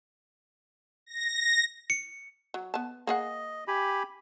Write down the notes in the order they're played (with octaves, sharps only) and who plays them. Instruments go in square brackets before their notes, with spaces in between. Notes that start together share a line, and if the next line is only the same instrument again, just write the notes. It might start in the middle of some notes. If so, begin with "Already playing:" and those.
[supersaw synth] A#6
[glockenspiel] C#7
[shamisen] F#3
B3 A5
[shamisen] A#3 G#4 F#5 [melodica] D#5
[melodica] G4 G#5 B5